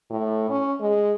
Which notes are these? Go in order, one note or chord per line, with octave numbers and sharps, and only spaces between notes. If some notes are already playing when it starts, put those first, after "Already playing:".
A2
C#4
G#3